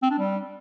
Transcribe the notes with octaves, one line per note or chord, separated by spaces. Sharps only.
C4
D4
G3